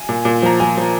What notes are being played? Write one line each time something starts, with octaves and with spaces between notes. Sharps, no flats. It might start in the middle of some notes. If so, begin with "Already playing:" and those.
Already playing: G#5
A#2
A#2
F3 A#5
F3 G#5
F3